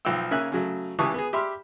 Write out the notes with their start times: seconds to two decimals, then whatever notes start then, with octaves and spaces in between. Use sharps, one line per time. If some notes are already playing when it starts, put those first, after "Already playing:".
0.05 B1 F3 F5 G5 E6
0.31 C#3 A#3 C#4 E5 G#5 F#6
0.52 C#3 F#3 A3
0.99 C#2 E3 G4 A5 C#6 D#6
1.14 B3 G#4
1.33 G4 E5 B5 C6 D6 F6